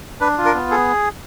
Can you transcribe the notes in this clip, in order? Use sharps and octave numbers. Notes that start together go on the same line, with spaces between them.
D4 B4
F4
A#4
B3
G#4 A4